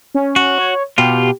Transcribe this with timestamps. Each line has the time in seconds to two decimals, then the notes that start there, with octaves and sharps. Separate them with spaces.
0.15 C#4
0.36 F#4
0.58 C#5
0.98 B2 F4 G4